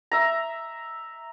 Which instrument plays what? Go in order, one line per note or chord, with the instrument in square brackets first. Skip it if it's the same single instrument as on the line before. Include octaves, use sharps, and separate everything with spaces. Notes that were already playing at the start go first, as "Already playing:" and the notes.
[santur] E5 A#5